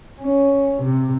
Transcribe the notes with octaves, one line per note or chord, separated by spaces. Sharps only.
C#4
C3